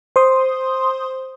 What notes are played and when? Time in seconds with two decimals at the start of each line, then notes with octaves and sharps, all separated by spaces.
0.16 C5 C6 D#6